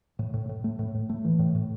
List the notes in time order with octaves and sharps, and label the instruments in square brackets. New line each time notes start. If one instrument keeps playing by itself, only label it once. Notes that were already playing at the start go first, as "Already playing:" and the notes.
[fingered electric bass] A2
A2
A2
A3
A2
A2
A3
E3
A2
A2